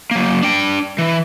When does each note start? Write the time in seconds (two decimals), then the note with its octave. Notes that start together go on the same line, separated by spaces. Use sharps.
0.11 F#3 A#3
0.43 D4 G5
0.98 E3